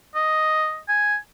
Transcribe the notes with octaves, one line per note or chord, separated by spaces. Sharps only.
D#5
G#5